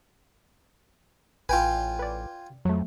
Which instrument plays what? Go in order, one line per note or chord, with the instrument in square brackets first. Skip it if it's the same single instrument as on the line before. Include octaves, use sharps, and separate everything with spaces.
[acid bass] A1 [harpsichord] F4 G5 G#5 [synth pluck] B4
[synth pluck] B4 D5
[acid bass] F2 [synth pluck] F#3 A3